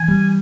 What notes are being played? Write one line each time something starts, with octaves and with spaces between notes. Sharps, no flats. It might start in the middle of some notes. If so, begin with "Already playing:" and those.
Already playing: E3 G#5
G3